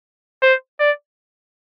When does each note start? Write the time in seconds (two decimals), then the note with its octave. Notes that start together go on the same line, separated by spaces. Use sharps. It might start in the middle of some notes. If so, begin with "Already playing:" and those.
0.42 C5
0.79 D5